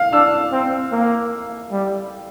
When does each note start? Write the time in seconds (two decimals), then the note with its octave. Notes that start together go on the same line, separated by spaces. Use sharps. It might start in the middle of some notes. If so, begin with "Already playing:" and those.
Already playing: F5
0.13 D4 E6
0.52 C4
0.92 A#3
1.72 G3